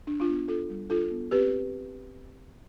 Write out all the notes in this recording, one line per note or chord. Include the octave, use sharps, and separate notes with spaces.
D4
D4 F4
B3
D4 F4 A4
G3
D4 F4 A4
B3
C4 G4 B4